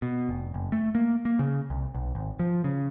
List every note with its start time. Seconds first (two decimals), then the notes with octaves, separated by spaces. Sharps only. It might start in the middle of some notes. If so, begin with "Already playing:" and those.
0.02 B2
0.29 F1
0.54 F#1
0.72 A3
0.95 A#3
1.25 A#3
1.39 C#3
1.70 C2
1.95 B1
2.15 G#1
2.39 F3
2.64 C#3